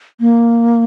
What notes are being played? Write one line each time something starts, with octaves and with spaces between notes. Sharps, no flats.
A#3